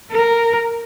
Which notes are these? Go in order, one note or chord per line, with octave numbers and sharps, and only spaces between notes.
A#4